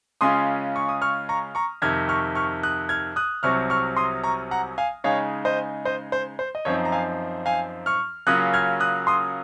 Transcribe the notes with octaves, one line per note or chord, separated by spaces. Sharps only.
C#3 G#3 C#4 F4 C6 D#6
C#6
D#6
C#6 F6
A#5 C#6
A#5 C#6
F2 C3 D#3 F6 G#6
C#6 F6
C#6 F6
D#6 F#6
F6 G#6
D#6 F#6
C2 C3 F#3 C4 C#6 F6
C#6 F6
C6 D#6
A#5 C#6
F#5 A#5
F5 G#5
C#3 G#3 D#4 C#5 F5
C5 D#5
C5 D#5
C5
C5
D#5
F#2 F3 C4 D#4 C#5
A#5
F5 G#5
F5 G#5
C#6 F6
C#3 F#3 A#3 C#4 F4 D#6 F#6
F6 G#6
D#6 F#6
C6 D#6